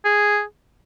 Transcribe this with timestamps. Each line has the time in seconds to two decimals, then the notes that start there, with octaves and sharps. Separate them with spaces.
0.05 G#4